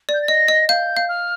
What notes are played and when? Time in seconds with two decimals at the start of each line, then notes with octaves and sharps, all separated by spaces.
0.09 D5
0.14 G6
0.22 A6
0.28 D#5 A#6
0.48 D#5
0.69 F5 G6
0.96 F5
1.09 F6